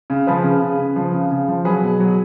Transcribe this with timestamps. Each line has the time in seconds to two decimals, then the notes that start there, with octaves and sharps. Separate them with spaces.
0.10 C#3
0.27 F3 G#4 B4
0.44 C#3
0.62 C#3
0.80 C#3
0.96 F3
1.13 C#3
1.31 C#3
1.48 F3
1.65 F#3 G#4 B4
1.82 B2
2.00 F#3